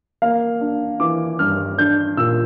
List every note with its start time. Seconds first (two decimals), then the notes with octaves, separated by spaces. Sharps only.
0.22 A#3 F5
0.61 D4
1.00 E3 D6
1.39 G2 F6
1.78 D4 G6
2.17 A#2 E6